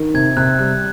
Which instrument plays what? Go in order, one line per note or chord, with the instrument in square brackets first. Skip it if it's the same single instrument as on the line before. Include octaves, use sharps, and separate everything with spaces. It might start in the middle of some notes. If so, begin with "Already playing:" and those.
Already playing: [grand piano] D#3
[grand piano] C3 [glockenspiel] G#6
[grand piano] C3 [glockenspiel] F#6
[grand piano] G3 [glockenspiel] F#6